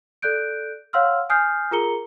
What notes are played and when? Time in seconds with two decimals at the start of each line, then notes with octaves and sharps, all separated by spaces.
0.22 A4 D5 F#6 G6 D7
0.93 C#5 F5 F#5 C6 E6 F6
1.30 G#5 D#6 F6 G6 C7
1.71 F4 G#4 A#4 A#5 C#7 G7